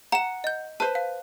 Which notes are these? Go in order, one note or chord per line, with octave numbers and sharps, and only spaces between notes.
F#5 A#5 E7
D#5 G6
B4 C5 A5
F5